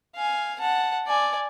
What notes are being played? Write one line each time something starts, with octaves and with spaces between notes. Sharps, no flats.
F5 G#5
F#5 A5
D5 G#5